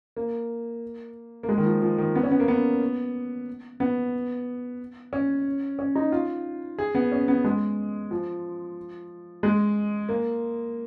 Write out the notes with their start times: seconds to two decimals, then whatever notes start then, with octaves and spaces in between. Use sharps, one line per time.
0.17 A#3
1.43 A#3
1.49 G#3
1.58 D#3
1.65 F3
1.82 F3
1.98 D#3
2.15 B3
2.23 C#4
2.31 B3
2.40 A#3
2.48 B3
3.80 B3
5.13 C#4
5.79 C#4
5.95 D#4
6.12 F4
6.78 G#4
6.95 B3
7.12 C#4
7.28 B3
7.44 G#3
8.11 F3
9.43 G#3
10.09 A#3